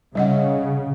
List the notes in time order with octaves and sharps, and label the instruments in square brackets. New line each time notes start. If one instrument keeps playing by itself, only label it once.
[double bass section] C#3 [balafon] G3 D#5 F#5